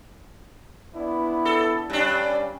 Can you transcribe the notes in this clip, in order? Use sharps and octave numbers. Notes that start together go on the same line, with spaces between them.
B3 D4 E4
A4
G2 G3 C#4 D4